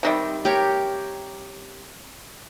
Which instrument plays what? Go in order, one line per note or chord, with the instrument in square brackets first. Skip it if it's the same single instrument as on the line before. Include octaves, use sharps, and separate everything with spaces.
[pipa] C3 D#3 G3
[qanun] G4 A#4 C#5